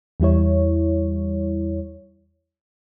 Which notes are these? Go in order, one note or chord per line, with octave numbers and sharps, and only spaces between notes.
E2 G3 E4 C#5